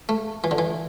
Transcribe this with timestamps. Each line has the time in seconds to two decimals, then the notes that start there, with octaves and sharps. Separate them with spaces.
0.09 A3
0.44 E3
0.51 D3
0.58 E3